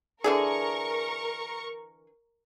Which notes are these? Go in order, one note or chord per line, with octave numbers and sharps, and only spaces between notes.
D3 E3 G#4 A#4 C#6